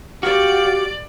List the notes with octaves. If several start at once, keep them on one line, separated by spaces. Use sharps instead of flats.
F#4 G4 D5 F5